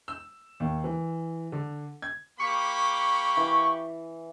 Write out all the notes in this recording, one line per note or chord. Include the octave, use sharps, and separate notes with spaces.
E6
D#2
E3
D3
G#6
A#3 G4 B5 C#6
E3